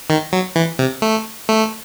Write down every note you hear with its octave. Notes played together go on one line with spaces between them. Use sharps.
D#3
F#3
E3
C3
A3
A3